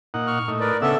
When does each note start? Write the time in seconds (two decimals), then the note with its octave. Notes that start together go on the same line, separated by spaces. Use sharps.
0.14 A#2 D#4 F#5
0.27 C#6 F6
0.48 A2 D#4
0.60 A#4 B4 D5
0.82 C#3 B3 D4 A4 E5 E6